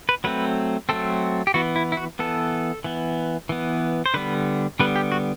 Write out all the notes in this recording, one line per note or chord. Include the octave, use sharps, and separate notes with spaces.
B4
F#3 A3 C4 B4
F#3 A3 C4 A4
G4
E3 B3 F#4
E4
E4
F#4
E3 B3 A4
E3 B3
E3 B3
C5
D3 G3 B3 B4
D3 G3 B3 B4
G4
F#4